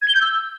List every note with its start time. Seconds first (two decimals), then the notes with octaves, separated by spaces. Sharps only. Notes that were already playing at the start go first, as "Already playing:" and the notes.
0.02 G#6
0.08 G7
0.15 G6
0.21 E6